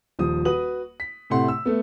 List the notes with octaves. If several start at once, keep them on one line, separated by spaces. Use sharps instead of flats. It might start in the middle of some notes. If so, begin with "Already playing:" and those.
D#1 F3 D#6
F#4 B4 D#6 F#7
B6
A2 C3 A3 F#5 C6
E6
A3 B3